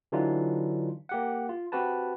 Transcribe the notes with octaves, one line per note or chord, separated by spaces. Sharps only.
D3 E3 F#3 D4 D#4 F4
A#3 G4 F#5
F4
C4 F#4 G4 B4 A5